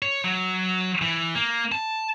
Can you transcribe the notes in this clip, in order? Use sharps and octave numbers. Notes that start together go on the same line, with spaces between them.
C#5
F#3
E3
A#3
A5